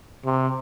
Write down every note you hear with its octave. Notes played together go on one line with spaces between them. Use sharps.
C3